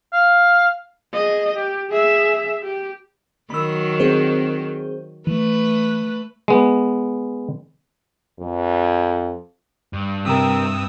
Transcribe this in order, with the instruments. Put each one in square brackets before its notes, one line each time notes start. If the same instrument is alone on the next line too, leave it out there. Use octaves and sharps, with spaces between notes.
[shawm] F5
[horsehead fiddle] G#4 D#5
G4
G#4 E5
G4
[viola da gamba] D#3 F#3 [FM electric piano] B5 E6
[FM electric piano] C4 G#4 C5
[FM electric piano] E3 [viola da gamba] A3 B4
[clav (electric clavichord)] G#3 B3
[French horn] F2
[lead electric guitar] G2
[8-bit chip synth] C3 D#6 E6 [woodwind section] C4 [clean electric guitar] G4 A#4